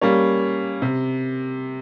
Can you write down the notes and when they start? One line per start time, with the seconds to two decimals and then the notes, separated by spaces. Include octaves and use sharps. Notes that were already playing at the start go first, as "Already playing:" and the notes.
0.01 G3 A#3 C#4
0.82 C3